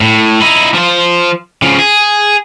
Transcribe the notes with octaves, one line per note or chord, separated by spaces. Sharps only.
A2
D#4 E4
F3 C5
C#3 F3
G#4